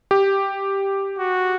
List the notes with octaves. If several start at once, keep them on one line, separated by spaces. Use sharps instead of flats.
G4
F#4